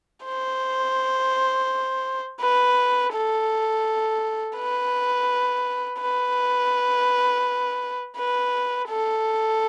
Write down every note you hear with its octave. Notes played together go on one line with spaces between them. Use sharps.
C5
B4
A4
B4
B4
B4
A4